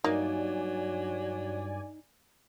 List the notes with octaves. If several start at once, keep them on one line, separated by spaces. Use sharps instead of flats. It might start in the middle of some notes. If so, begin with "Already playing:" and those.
G2 F#3 A#3 D#4 D5 G#5